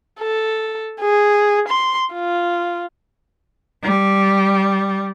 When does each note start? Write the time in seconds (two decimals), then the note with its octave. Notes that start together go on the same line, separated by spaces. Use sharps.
0.20 A4
1.00 G#4
1.68 C6
2.13 F4
3.83 G3